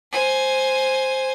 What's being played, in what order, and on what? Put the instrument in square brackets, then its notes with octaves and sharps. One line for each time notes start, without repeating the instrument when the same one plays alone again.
[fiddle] C5 G#5